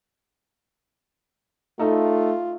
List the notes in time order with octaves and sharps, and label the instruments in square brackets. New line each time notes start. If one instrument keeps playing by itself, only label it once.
[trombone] A3 [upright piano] D#4 A4 [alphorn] F4